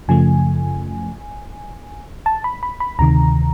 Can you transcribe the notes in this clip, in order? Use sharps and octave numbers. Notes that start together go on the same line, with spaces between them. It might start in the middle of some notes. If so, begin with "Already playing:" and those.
F#2 C#3 F3 A3 G#5
A5
B5
B5
B5
D2 C3 D#3 A#5